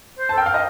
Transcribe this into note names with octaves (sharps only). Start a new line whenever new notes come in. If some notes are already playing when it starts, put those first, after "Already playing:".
C5
A5
A4
G5
A#4
F5
D#5